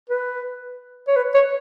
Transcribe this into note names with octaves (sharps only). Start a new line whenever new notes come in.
B4
C#5
B4
C#5